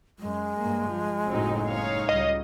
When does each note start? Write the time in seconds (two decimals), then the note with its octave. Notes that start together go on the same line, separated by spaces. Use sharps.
0.19 F#2 G#3
0.59 G2 A#3
0.89 F3
1.26 F#1 A2 F#3 C4 D#4
1.67 D#4 C#5 F5
2.09 C#2 G3 D#5